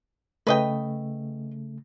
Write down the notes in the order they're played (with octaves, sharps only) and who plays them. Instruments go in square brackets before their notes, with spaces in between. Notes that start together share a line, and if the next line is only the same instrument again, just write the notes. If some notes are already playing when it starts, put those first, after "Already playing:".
[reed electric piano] C#3 A3 [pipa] B4 D#5 G5